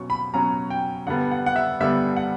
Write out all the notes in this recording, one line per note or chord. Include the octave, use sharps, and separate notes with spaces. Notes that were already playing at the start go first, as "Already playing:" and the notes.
Already playing: B2 F#3 C#4 C#6
B5
B2 F#3 C#4 A#5
G5
G2 D3 G3 B3 F#5
F#5
F#5
E5
G2 D3 G3 B3 E5
F#5